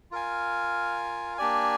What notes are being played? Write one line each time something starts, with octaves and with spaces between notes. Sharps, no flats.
F4 A#4 F5 G#5
A#3 D4 G4 D5 G#5